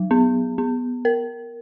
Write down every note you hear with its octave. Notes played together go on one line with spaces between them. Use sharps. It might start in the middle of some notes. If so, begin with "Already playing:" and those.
Already playing: F#3
B3
B3
A#4